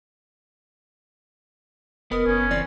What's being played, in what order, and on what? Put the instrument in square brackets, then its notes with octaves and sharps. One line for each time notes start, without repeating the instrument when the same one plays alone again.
[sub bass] F1 [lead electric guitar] B3 [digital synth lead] A#4 [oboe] D#5
[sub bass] F#1 [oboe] C#4
[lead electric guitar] E3 C4 [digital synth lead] D5